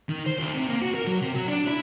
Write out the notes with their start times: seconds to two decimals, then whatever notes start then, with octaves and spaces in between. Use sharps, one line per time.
0.09 D#3
0.26 C5
0.39 D2
0.53 C3
0.68 A#3
0.82 F#4
0.95 A#4
1.07 F#3
1.21 C3
1.35 F#3
1.48 D4
1.67 E4